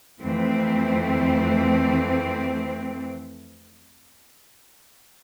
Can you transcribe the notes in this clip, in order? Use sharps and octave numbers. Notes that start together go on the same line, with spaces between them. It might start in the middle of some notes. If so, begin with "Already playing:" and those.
F2 E3 A3 C4